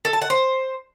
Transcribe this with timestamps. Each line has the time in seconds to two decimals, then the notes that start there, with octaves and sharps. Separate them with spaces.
0.05 A4
0.13 A5
0.22 F#5
0.30 C5